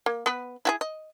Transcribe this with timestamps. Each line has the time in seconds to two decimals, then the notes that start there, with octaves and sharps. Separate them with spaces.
0.06 A#3
0.26 B3 B4
0.65 E4 F#4 G#4
0.81 D#5